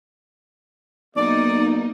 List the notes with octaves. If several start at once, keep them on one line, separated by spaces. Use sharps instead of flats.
B1 A#3 D#4 D5